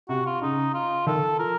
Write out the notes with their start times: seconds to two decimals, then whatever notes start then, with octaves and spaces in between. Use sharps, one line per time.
0.09 C3 F#4
0.26 F4
0.42 C#3 D#4
0.74 F4
1.07 D#3 A4
1.39 F3 A#4